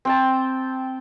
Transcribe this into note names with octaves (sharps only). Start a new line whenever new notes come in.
C4 G5 A5